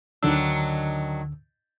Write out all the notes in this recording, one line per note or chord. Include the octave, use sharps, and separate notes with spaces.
D2 D3 D#3 F#3 D4 E6